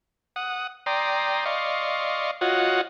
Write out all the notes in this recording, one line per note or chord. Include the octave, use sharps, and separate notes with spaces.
F#5 D#6
D5 G5 A#5 C6 D#6
D5 D#5 F5 C6 C#6
F4 F#4 C#5 D#5 F#5